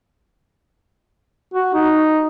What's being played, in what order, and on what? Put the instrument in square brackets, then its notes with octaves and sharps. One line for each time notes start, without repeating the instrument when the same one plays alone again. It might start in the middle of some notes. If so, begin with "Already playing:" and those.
[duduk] F#4
D#4